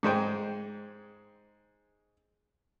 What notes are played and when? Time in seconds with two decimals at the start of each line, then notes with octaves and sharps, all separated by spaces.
0.03 G#2 G#3 C5 G5